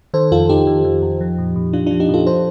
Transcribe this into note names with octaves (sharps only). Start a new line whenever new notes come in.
D#3 A4 C5
F2 F4 A4
F2 D#4 G4
D#3
D#3
F2
F3
A#2
A#2
F3 D4 F4
F3 D4 F4
D#4 G4
A#2
F4 A4
F3 A4 C5